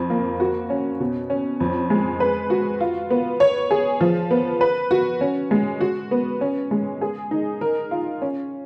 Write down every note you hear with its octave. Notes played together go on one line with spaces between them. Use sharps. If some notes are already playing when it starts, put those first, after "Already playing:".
Already playing: F2
A#3
F#4
C#4
B2
C#4
F2
G#3
B4
F#4
F4
B3
C#5
G#4
F3
B3
B4
F#4
C#4
G#3
F#4
B3
C#4
G#3
G#4
D#4
A#4
F4
C#4